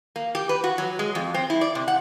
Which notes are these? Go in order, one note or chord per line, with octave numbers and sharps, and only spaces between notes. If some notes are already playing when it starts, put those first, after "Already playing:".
A#3
G4
B4
F#4
F#3
G#3
F2
C4
E4
D5
C3
F#5